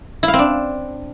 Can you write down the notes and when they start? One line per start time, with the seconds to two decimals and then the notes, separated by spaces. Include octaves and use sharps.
0.23 E4
0.28 F5
0.33 C4
0.39 D4